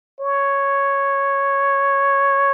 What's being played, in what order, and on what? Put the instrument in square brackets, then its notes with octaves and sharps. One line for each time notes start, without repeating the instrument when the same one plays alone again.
[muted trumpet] C#5